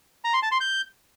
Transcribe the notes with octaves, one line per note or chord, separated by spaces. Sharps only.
A#5
C6
A5
C6
G6